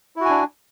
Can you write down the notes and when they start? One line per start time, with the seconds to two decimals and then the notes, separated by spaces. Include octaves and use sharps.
0.16 E4
0.21 F#4
0.25 G#5
0.30 D4